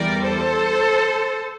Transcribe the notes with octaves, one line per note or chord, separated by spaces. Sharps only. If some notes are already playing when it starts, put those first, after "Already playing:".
Already playing: E2 E3 G3 A#4 D5
A4 C5